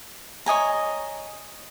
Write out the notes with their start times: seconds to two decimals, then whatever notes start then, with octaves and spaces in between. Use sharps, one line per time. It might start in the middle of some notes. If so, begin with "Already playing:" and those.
0.46 C#5 D#5 G#5 A#5